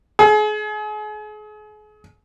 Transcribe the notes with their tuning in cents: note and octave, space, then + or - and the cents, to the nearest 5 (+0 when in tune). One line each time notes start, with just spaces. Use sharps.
G#4 +35